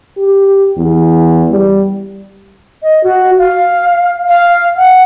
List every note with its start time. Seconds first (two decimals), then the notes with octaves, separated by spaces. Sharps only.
0.18 G4
0.77 E2
1.51 G3
2.83 D#5
3.04 F#4
3.39 F5
4.28 F5
4.77 F#5